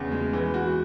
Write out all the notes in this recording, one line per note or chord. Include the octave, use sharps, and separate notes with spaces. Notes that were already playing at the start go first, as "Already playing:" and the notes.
Already playing: E2 C#3
G#3
E3
F#4